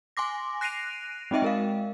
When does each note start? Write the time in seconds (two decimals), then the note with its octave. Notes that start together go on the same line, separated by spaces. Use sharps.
0.17 G#5 C6 D6 A#6
0.61 F#6 A#6 C7 D7 D#7 F7
1.31 G#3 C4 D#4 D#5 E5 G5
1.42 G#3 A#4 F5